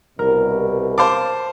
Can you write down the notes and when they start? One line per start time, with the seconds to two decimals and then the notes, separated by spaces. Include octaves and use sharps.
0.19 C2 B2 A#4
0.98 C5 F5 A5 D6